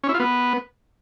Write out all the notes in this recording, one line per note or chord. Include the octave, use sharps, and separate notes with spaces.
C#4
E4
F4
B3